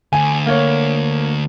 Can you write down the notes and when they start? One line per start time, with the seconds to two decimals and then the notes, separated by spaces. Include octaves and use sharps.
0.13 D2 G#5
0.46 A#3 C#5